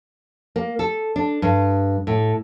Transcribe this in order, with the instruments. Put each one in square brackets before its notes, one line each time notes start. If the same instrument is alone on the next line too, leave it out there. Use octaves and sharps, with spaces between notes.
[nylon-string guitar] A#3
A4
D4
G2
A2